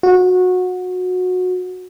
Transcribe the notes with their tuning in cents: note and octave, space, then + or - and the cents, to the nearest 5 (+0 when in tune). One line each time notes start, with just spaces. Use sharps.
F#4 -20